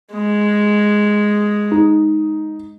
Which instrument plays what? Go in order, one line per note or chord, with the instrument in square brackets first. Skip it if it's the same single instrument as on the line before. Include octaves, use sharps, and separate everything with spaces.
[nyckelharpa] G#3
[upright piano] D#4